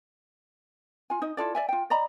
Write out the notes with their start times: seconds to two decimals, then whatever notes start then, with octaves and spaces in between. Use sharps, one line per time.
1.10 F4 G#5
1.22 D#4 D#5
1.37 E4 F4 A4 D5
1.55 D5 E5 G#5
1.69 F4 G5
1.90 D5 D#5 A#5 B5